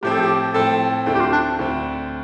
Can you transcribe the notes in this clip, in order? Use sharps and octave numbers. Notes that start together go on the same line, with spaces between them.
A2 F3 C4 G4
A4
G4
A2 F3 C4 A4
D2 D3 A3 C4
G4
F4
D4
D2 D3 A3 C4